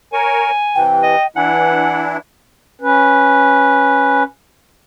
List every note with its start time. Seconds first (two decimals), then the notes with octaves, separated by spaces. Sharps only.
0.13 A#4 C#5 G#5
0.75 C3 E3 G5
1.03 D#5
1.36 E3 D4 E4 F#5 G#5
2.81 C#4 B4